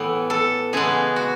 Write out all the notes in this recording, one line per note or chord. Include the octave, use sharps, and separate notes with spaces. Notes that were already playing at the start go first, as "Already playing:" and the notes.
Already playing: A2 E3 B3
A4
C#3 E3 G#3 B3 G#4
F#4